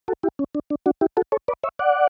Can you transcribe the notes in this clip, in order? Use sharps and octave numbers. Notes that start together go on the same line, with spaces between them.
F#4 A4
E4 G4
C#4
D4
D4
D4 F#4
E4 G4
F#4 A4
A4 C#5
B4 D5
C#5 E5
D5 F#5